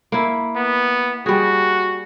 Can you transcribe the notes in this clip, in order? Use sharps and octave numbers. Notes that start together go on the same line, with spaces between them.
A#3 E4
B3
G3 F#4 G#4